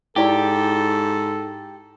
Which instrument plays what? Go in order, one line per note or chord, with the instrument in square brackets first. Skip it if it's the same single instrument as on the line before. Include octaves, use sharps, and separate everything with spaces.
[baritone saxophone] G#2 [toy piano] E4 D5 C#6 [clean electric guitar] G4 [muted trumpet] A4